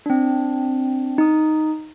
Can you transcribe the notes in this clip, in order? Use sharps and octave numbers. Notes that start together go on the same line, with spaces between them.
C4 D4
D#4 D#6